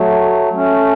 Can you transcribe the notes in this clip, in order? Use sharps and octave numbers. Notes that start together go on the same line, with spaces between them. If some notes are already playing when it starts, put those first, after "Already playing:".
Already playing: F#3 A3
A3 C#4